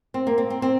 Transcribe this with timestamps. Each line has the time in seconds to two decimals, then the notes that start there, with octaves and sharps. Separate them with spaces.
0.14 C4
0.27 A#3
0.38 C4
0.50 C4
0.62 C4